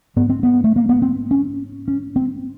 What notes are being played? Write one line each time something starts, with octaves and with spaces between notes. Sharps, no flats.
G#2 B3
C4
B3
A3
A#3
B3
C4
C#4
C#4
C4